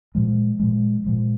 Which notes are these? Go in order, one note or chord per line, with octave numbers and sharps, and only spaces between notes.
A#2 F3 G#3
A#2 F3 G#3
A#2 F3 G#3